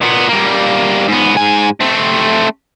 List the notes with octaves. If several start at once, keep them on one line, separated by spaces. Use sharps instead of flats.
A#2 B3
G3 A#3
G#2 B3
G#2 G#5
A3 C4